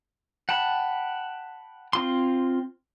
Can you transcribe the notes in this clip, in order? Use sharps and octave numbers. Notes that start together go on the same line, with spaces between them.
F#5 G5 A5 B5
C4 F4 C6